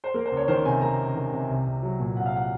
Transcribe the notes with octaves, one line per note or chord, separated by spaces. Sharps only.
C5
A#3 A#4
C5
C#2
C#5
D#3 C5
C3 G#5
A#3 A#5
C#2
D#3
C3
C2
C2
F#3
A#2
C2 F#5
F5
F#5